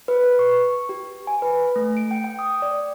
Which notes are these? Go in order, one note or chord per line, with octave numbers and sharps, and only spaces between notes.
B4
B4
C#6
G4
G#5
B4
A3
D7
G5
G5
D#6
D5